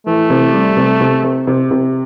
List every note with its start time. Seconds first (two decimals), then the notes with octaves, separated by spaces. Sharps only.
0.06 E3 A3
0.30 C3
0.53 G3
0.77 C3
1.01 C3
1.23 C3
1.47 C3
1.71 C3